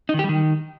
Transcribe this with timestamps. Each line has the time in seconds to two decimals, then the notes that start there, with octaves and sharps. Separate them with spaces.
0.09 D#4
0.14 D#3
0.19 G4
0.24 G3
0.29 D#3